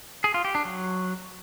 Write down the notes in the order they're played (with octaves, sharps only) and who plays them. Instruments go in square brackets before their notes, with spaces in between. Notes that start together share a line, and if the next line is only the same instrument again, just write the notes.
[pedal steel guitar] G#4
F4
G4
D4
F#3